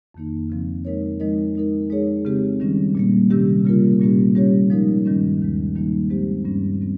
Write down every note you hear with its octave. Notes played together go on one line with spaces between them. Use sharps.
F2 D#3 A#3 D#4
C#3 F3 C4
G#3 D#4 A#4 C#5
F3 G#3 D#4 A#4 D#5
G#3 D#4 A#4
G#3 D#4 G#4 C#5
C#3 G#3 C4 G4
D#3 G3 C#4
A#2 G3 A#3
C3 D#3 G3 C#4 G4
C#3 G3 A#3 F4 A#4
A#2 G3 A#3 C#4 G4
G3 C#4 G4 C#5
F3 G#3 D#4 A#4
G2 D#3 G3 C#4
D#2 D#3 G#3
D#2 D#3 G3 A#3 D#4
F3 G#3 C4 G4 C5
G2 G3 C#4
G3 C4